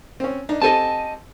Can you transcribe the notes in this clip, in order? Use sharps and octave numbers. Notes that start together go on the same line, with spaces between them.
C4 C#4
D4 D#4
C4 G4 A4 D#5 G#5 A5